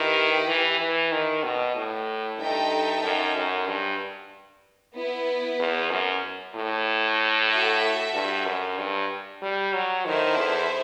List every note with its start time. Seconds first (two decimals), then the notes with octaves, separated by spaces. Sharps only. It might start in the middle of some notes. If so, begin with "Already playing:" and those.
Already playing: D#3 E4 G4 B4
0.48 E3
0.80 E3
1.12 D#3
1.44 B2
1.76 A2
2.39 G2 D#4 A4 E5 G5
3.03 F#2
3.36 F#2
3.67 G2
4.95 B3 E4 B4
5.59 E2
5.90 F#2
6.55 A2
7.51 F#4 A4 E5
8.14 G2
8.46 F#2
8.78 G2
9.42 G3
9.74 F#3
10.05 D#3 E4 A4 C5 E5
10.37 E2